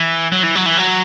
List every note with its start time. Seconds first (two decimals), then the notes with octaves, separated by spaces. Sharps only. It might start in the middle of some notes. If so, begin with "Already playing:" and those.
Already playing: E3
0.32 F#3
0.44 E3
0.55 F#3
0.66 E3
0.78 F#3